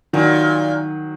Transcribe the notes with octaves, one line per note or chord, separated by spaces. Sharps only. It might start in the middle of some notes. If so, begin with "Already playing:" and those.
A#2 D#3 F#3